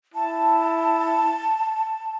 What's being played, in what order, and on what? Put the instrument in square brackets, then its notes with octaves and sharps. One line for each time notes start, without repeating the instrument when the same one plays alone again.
[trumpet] E4 [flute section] A5